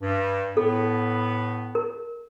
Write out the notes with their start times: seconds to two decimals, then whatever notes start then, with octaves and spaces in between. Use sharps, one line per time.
0.02 G2
0.57 A2 B3 A4
1.75 A#4